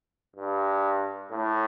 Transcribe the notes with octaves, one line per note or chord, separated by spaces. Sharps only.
G2
A2